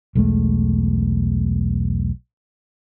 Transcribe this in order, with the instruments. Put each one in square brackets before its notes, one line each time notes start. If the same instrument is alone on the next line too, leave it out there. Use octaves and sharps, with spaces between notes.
[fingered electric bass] B1 E2 G#3 A3